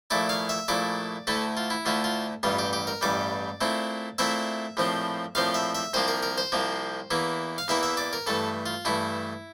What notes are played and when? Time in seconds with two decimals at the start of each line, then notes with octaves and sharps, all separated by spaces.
0.11 A#1 A#2 A3 E4 D5
0.29 F5
0.49 E5
0.68 A#1 A#2 A3 E4 D5
1.27 D2 D3 A3 E4 A4
1.57 F4
1.70 E4
1.85 D2 D3 A3 E4 F4
2.04 F4
2.43 A1 G2 E3 G3 F4
2.59 G4
2.73 G4
2.87 A#4
3.01 A1 G2 E3 G3 D5
3.61 A#2 A3 C4 E4
4.18 A#2 A3 C4 E4 E5
4.77 A#1 A2 F3 C4
5.35 A#1 A2 F3 C4 F5
5.54 E5
5.75 E5
5.94 C2 C3 F3 A#3 C5
6.08 A#4
6.23 A#4
6.38 C5
6.52 C2 C3 F3 A#3
7.11 E2 E3 A#3 E4
7.58 F5
7.68 E2 E3 A#3 E4 E5
7.83 E5
7.97 D5
8.13 A#4
8.27 G2 E3 A3 A4
8.66 F4
8.85 G2 E3 A3 E4